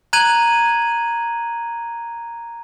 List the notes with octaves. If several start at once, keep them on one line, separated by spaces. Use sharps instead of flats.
A#5 F#6 G#6 D#7 F#7